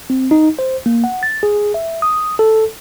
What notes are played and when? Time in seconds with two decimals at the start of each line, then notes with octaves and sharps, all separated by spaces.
0.10 C4
0.31 D#4
0.59 C5
0.86 A#3
1.04 F#5
1.23 A6
1.43 G#4
1.74 E5
2.02 D#6
2.39 A4